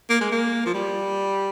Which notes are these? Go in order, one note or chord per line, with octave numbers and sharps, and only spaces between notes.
A#3
G#3
A#3
F3
G3